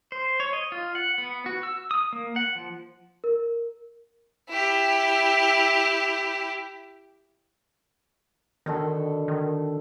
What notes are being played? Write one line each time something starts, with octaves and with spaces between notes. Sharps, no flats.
C5
C#5
D#5
F4
F#5
B3
F#4
E6
D#6
A#3
F#5
F3
A#4
E4 G4
B2 D3 D#3 A4
D#3